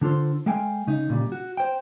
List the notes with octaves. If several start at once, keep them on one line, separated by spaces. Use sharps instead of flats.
D3 D4 F4 A4 C5
G#3 A4 F5 G5 G#5
C#3 D#4
A#2 C#3 G3
F#4
C5 G5